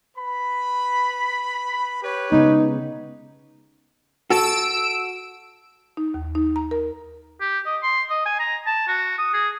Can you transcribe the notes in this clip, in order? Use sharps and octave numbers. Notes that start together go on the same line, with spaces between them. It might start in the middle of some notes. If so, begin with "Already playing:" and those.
B4 B5
G4 B4 C#5
C#3 G#3 B3 D#4
F#4 A4 E6 D7
D#4
D#2
D#4
A#5
A#4
G4
D#5
C6
D#5
G#5
A#5
A5
F#4
D#6
G#4